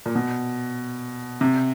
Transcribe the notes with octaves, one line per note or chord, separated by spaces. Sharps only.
A#2
B2
C3